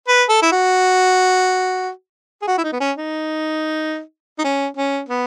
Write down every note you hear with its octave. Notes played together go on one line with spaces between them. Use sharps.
B4
A4
E4
F#4
G#4
F#4
E4
D#4
B3
C#4
D#4
D#4
C#4
C#4
B3